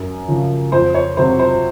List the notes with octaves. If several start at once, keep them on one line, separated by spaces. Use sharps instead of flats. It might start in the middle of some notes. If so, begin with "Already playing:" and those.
Already playing: F#2
C#3 F3
F2 C5
C#5
C3 F#3 C5
C5